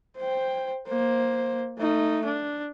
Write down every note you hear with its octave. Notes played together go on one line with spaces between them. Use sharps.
C5 G5
A#3 C5
A3 D#4
D4